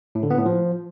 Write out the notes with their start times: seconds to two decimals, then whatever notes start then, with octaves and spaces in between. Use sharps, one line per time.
0.15 A2
0.23 D3
0.30 B3
0.38 A2
0.46 F3